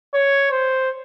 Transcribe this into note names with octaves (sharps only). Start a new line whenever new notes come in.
C#5
C5